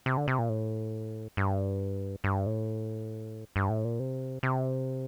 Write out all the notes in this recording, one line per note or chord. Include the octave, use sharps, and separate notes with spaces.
C3
D3
C3
A#2
A2
G2
G2
A2
G2
A2
A#2
C3
C3